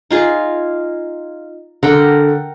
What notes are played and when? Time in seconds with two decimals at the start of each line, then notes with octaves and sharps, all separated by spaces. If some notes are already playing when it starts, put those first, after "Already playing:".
0.11 D#4 F4 G#4
1.83 D3 A#4 F#5 G5